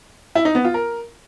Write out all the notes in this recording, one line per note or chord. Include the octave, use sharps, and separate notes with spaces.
E4
D#4
B3
F4
A#4